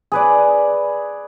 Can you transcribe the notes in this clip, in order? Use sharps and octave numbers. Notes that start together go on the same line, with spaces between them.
G#4 B4 D5